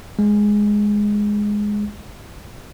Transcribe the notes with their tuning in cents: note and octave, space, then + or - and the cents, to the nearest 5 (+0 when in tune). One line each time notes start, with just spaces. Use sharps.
G#3 +0